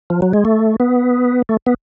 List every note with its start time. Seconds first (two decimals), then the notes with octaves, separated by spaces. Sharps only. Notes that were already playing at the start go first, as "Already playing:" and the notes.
0.10 F3
0.22 F#3
0.33 G#3
0.45 A3
0.80 B3
1.49 A3
1.66 B3